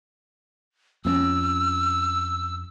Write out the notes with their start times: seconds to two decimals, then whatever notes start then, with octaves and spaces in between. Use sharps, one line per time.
1.05 F2 B3 C#4 E6